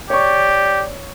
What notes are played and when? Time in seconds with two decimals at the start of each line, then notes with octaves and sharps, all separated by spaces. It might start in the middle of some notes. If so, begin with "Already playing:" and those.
0.10 G4 C#5 D5 C#6